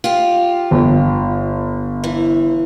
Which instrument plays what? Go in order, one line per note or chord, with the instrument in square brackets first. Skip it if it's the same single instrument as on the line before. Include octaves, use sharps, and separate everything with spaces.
[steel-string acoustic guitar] F4 G4
[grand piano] G1
[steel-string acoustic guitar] E3